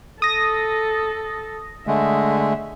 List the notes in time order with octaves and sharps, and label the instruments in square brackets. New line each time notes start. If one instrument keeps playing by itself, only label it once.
[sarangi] A4 [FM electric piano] D#6 A#6
[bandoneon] D3 G#3 A3 [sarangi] E5